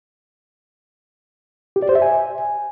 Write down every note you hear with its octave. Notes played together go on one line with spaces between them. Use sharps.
G4
D5
C5
E5
G#5